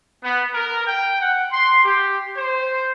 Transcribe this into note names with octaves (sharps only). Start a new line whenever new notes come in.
B3
A#4
G5
F#5
C6
G4
C5